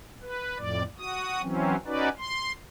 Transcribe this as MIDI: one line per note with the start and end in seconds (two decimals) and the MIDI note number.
0.22 0.57 71
0.58 0.83 41
0.58 0.83 45
0.58 0.83 74
0.98 1.42 66
0.98 1.42 87
1.42 1.76 52
1.42 1.76 54
1.42 1.76 60
1.42 1.76 61
1.86 2.09 61
1.86 2.09 63
1.86 2.09 66
1.86 2.09 71
1.86 2.09 74
2.18 2.52 84